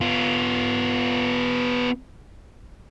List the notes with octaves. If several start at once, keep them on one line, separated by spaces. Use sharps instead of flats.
B3 F4